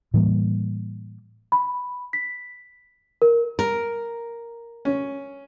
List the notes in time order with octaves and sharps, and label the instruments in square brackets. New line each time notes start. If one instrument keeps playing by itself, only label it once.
[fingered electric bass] A2 E3 G3 A#3
[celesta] B5
B6
A#4
[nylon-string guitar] A#4
[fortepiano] C#4